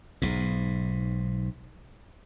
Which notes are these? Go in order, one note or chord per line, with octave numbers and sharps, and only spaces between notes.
B1 G#2